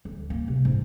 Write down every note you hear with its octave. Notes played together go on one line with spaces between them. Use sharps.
D2
A#3
C3
G#2